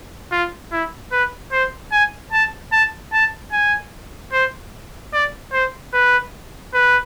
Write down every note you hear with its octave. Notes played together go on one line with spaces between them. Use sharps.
F4
E4
B4
C5
G#5
A5
A5
A5
G#5
C5
D5
C5
B4
B4